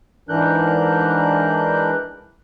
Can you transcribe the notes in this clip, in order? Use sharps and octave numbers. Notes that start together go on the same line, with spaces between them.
G#2 E3 D4 A#4 F#6 G6